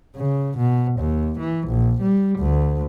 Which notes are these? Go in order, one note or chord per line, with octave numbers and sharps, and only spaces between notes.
C#3
B2
D#2
E3
A#1
G3
D2